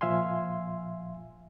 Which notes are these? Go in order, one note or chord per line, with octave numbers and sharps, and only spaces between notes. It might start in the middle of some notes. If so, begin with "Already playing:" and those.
A#2 F3 E5 F5 G#5 C6